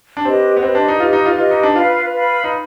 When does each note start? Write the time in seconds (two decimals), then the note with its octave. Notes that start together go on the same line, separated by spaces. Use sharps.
0.17 D4
0.25 C4 G4 B4 D#5
0.57 B3
0.62 C4 G4 B4 D#5
0.75 D4
0.88 D#4
1.00 F4 G4 B4 D#5
1.13 D#4
1.26 F4
1.38 F4 G4 B4 D#5
1.51 D#4
1.63 D4
1.76 F4 B4 F5 B5
2.13 B4 F5 B5
2.44 D#4